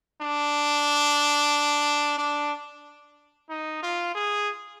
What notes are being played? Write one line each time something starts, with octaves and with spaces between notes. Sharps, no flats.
D4
D4
D#4
F4
G#4